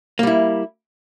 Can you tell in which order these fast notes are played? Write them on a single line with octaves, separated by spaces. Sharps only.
A#3 G3 E4